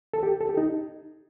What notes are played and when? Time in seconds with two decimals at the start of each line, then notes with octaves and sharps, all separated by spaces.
0.14 A4
0.23 G4
0.41 A4
0.49 G4
0.57 D#4